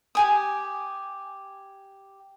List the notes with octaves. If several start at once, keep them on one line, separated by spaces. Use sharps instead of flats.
G4 G#5 D#6